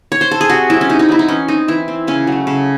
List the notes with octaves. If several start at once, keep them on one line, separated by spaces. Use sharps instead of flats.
C#5
C5
A4
G#4
C3 F#4
F#3 C4 E4
C#4
C3 D#4
D#4
F#3 C4 E4
D#4
E3 C#4
C4 D#4
E3 E4
C4
C#3 C#4
F#3 A3
C#3